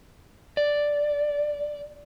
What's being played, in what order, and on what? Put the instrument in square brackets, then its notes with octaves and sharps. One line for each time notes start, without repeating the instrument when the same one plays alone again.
[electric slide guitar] D5